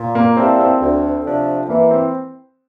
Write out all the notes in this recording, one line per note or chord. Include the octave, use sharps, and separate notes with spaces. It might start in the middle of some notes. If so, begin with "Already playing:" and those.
Already playing: A#2
A#3
G3 A#3 C4 E4 A4
C4
D2
C3 F3 A3 D4
E3 A#3
C4